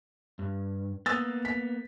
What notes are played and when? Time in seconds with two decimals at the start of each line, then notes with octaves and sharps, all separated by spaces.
0.39 G2
1.06 A#3 B3 D#6 E6 A6
1.45 B6